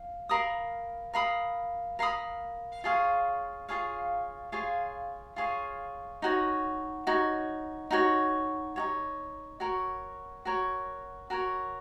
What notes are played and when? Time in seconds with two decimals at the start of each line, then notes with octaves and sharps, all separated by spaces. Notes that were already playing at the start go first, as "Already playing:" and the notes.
Already playing: F5
0.29 A#4 F5 B5 D#6
1.14 A#4 F5 B5 D#6
1.99 A#4 F5 B5 D#6
2.84 F4 G#4 C#5 F5
3.68 F4 G#4 C#5 F5
4.52 F4 G#4 C#5 F5
5.36 F4 G#4 C#5 F5
6.22 D#4 F#4 C#5
7.07 D#4 F#4 C#5
7.91 D#4 F#4 C#5
8.76 D#4 F#4 C#5
9.60 F#4 A#4 C#5
10.45 F#4 A#4 C#5
11.30 F#4 A#4 C#5